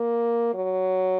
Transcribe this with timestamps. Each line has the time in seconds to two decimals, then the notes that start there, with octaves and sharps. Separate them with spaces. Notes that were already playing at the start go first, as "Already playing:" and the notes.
Already playing: A#3
0.54 F#3